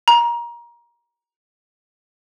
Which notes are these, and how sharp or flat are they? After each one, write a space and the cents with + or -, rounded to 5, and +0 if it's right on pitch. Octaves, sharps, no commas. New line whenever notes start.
A#5 +25